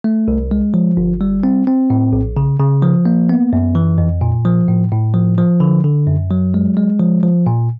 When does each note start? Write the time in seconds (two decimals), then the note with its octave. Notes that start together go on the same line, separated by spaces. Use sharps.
0.04 A3
0.28 C2
0.51 G#3
0.74 F3
0.97 G1
1.21 G3
1.43 C4
1.67 C4
1.90 A2
2.13 A#1
2.37 C#3
2.59 C#3
2.82 F3
3.05 A#3
3.29 B3
3.53 F#2
3.75 E3
3.98 F2
4.21 A#2
4.45 F3
4.68 A2
4.92 A2
5.14 F3
5.38 F3
5.60 D3
5.84 D3
6.07 F#2
6.31 F#3
6.54 G#3
6.77 G#3
7.00 F3
7.23 F3
7.47 A#2